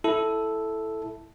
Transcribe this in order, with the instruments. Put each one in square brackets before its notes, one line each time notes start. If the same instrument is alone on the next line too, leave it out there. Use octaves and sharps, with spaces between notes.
[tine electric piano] E4 A4